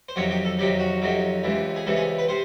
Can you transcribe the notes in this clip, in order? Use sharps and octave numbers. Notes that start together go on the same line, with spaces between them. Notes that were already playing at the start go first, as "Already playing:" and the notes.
C5
F2 C3 D#3 F#3 C#5
G4
A4
F2 C3 D#3 F#3 G4
F#4
F2 C3 D#3 F#3
C#2 C3 E3
G#4
C#2 C3 E3 A4
G#4
B4
C3 C5